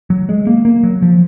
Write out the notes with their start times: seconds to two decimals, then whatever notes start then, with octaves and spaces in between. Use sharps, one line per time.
0.10 F#3
0.29 G#3
0.47 A#3
0.65 A#3
0.83 F#3
1.02 F3